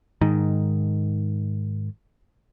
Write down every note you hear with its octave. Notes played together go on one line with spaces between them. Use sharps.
G#2 D#3